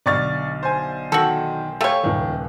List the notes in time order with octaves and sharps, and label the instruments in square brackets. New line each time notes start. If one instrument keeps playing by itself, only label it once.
[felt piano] B1 D3 F6 [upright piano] D5 C#6 A6
[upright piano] C5 G#5
[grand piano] D#3 [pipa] F#4 A4
[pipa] A3 C#5 [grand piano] G4 A4 F5
[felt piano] D#1 C#2 B4 [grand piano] D#3